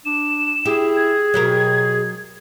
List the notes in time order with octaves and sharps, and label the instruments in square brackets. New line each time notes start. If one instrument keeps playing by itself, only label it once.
[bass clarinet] D4 [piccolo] E7
[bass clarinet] E4 [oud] G4 [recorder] G#4
[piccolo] G#6
[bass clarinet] B2 [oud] F#3 G4 A#4